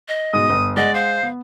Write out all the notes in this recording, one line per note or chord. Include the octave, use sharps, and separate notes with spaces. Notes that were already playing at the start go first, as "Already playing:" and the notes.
D#5
G#2 B2 D#6
G1
G#3 D5 D#5 F#5
C5 F5
B3